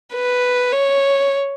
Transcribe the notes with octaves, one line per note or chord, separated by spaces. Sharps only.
B4
C#5